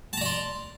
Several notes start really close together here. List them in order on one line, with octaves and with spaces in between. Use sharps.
A5 A#5 D5 C6